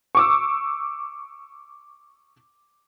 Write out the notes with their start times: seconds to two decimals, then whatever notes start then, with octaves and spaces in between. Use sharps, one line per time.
0.15 C#6 D6 E6